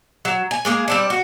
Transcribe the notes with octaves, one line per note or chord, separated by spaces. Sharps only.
F#3
G#5
G#3 A#3 G#4
G3 C4 D4
F#4